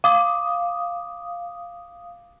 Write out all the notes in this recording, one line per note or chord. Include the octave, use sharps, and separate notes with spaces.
F5 D6 D#6